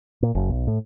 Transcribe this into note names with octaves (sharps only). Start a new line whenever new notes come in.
A#2
F#1
B1
A2